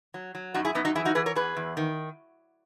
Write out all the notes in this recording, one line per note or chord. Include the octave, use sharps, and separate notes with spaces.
F#3
F#3
F#2 D#4 F#4
E4 G#4
F#2 B3 D#4
D#4 F#4
E3 E4 G#4
D#4 F#4
E3 G#4 B4
A#4 C#5
E2 G#4 B4
E2
D#3